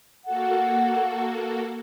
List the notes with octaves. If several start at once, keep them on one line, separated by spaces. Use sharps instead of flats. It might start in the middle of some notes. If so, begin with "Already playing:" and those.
A#3 F#4 A4 F#5